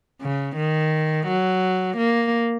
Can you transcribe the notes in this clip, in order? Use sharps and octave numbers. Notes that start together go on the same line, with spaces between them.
C#3
D#3
F#3
A#3